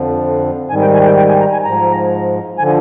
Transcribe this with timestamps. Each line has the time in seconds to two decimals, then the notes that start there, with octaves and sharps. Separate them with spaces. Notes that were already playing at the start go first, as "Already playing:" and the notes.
Already playing: F2 D3 F3
0.70 G#2 D#3 G3 G#5
0.82 G5
0.94 G#5
1.06 G5
1.17 G5
1.29 G#5
1.40 A#5
1.53 G#5
1.64 G#2 F3 A#5
2.58 D3 F3 G#5